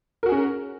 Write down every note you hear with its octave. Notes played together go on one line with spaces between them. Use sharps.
C#4 F#4 G#4 A#4